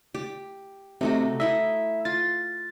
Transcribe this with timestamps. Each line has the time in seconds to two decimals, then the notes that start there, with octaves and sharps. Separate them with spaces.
0.14 G4
1.01 C3 A3 D#4 F#4
1.40 D#4 E4 D#5 E5
2.05 F4 A6